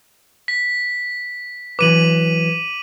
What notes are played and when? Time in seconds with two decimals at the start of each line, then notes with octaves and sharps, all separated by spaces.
0.48 B6
1.79 E3 F#3 B4 D6 D#7 F#7